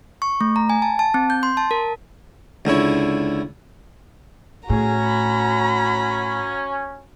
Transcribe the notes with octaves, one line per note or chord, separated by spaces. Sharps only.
C#6
A3
A#5
G#5
A5
A5
C4
G6
C6
A5
A#4
C#2 D3 E4 C#5
A2 C#4 F#4 G#4 A#5
B5